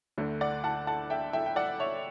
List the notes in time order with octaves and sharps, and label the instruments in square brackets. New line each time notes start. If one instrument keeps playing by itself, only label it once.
[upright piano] D2 D3 A3
D5 F#5
F#5 A5
F#5 A5
E5 G5
E5 G5
G5
D5 F#5
C#5 E5